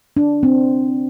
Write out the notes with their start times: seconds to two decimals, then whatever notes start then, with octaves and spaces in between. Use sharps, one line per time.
0.17 D4
0.43 C4